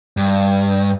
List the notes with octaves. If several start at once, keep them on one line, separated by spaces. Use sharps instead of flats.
G2